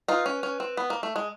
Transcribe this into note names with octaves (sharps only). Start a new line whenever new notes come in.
D#4 F4 B4
C#4
C#4
C4
B3
A#3
A3
G#3